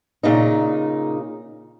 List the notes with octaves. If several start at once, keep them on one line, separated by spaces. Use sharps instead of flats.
A#2 C#3 D#4